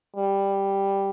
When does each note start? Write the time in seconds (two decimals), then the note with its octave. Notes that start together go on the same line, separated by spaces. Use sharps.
0.16 G3